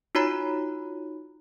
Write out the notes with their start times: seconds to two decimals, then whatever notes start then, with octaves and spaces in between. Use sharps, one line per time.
0.15 D#4 F4 F#4 C#5 A#5 B5